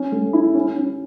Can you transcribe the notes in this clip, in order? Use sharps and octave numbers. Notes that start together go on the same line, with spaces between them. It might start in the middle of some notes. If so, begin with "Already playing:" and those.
Already playing: C#4
A3
E4
C#4
C#4